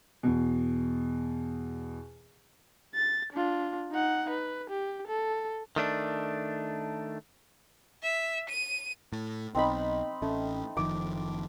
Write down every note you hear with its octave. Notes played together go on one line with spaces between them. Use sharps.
E2 B2
A6
D4 F4
D#4 F#5
B4
G4
A4
D#3 A3 D4
E5
D#7
A2
B1 C4 D#4 B5
A1 A3 C#4
F#1 D#3 F3 D6